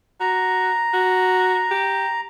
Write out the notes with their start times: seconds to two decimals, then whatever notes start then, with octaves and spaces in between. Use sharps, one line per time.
0.20 F#4 A#5
0.94 F#4
1.71 G4